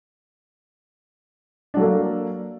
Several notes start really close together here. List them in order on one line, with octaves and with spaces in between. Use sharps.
D4 F#3 A4 A#3